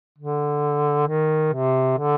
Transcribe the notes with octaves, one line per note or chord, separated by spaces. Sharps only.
D3
D#3
C3
D3